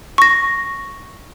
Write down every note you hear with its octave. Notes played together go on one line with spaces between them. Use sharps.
C#6 A#6